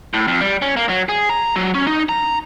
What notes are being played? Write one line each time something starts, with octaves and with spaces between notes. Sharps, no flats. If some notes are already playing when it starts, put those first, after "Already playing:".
A2
F2
G3
C#4
A#3
F#3
G#4
A#5
F#3
C#4
D#4
A#5